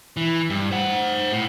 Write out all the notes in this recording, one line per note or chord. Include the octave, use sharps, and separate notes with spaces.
E3
G2
C5 F#5
A2